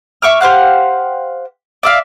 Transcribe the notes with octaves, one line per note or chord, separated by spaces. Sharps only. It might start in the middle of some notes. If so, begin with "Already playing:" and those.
E5 C#6 D6 F6
G4 C5 F5 F#5
D5 E5 F5